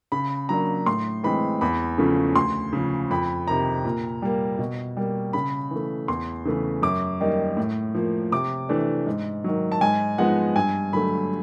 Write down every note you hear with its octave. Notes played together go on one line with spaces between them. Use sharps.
C#3 B5
F#3 A#3 D4 A#5
A2 C6
E3 G#3 C4 B5
E2 B5
C#3 F3 A3 C#4
D2 C6
C#3 F3
F2 B5
C3 D#3 A#5
A#2
G3 A#3
B2
G3 A#3
C#3 B5
E3
A3
E2 C6
C#3 E3 A3
F#2 D6
D#3 G3 A#3 D#4
A2
F3 A#3
C3 D6
E3 A3 D4
G#2
D#3 F#3
A5
G#2 G#5
F3 G#3 B3 D#4 F#5
G2 G#5
D3 F#3 A3 B5